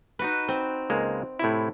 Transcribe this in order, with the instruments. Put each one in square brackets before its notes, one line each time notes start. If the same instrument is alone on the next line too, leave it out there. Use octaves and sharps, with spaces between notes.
[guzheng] D#4 F#4 B4
C4
[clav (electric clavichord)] C#2 G#3 A#3
A2 C3 E4